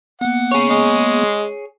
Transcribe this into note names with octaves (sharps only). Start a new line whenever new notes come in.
A#3 B3 F#5
G#4 C#5
G#3